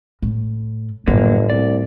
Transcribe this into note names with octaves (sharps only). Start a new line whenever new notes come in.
A2
G1 F#2 A2 D3 A3 A#3
C2 D5